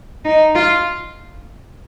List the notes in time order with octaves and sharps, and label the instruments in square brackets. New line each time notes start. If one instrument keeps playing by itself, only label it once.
[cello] D#4
F4